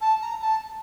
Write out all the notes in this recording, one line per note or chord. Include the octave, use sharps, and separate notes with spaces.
A5
A#5
A5